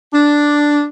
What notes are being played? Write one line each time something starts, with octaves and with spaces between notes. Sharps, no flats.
D4